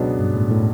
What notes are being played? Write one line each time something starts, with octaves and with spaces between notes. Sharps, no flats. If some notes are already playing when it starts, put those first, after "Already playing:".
Already playing: C#2 B2 F#3 B3 D4
G2
A2
A2